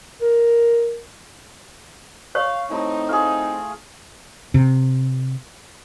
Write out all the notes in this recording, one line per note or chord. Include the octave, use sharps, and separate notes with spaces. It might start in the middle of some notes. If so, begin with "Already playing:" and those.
A#4
C#5 F5 C#6
A2 C4 D#4 A5 C6
A3 F4 G#4 F6
C3